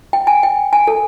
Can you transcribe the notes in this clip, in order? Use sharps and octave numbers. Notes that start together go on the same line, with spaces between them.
G5
G#5
G5
G#5
A4